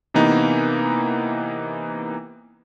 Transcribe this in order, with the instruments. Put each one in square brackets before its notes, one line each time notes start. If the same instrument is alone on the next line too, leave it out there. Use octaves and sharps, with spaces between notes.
[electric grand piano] C3 E3 A#3 B3 D#4